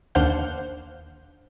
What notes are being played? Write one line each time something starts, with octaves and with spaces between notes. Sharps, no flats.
D#2 D4 C5 F5 F#5 G6